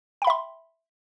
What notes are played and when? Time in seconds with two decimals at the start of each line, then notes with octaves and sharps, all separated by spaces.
0.22 G5
0.24 B5
0.27 E5
0.30 C6